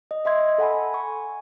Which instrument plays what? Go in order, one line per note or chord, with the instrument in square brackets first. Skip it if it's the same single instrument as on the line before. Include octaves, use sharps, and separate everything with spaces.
[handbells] D#5
D#5 E5 C6 G#6
A4 F#5 G#5 B5
G#5 C#6